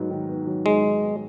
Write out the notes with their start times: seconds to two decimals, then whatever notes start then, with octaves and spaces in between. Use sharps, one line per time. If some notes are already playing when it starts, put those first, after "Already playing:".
Already playing: G#2 F#3 B3
0.10 D#3
0.29 B3
0.47 F#3
0.66 G#2 G#3
0.84 D#3
1.03 B3